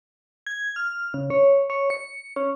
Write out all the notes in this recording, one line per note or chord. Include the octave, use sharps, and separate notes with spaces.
G#6
F6
C#3
C#5
C#5
C#7
C#4